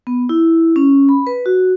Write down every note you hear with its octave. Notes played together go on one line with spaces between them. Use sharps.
B3
E4
C#4
B5
B4
F#4